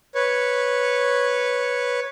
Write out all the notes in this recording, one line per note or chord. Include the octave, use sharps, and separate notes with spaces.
B4 C#5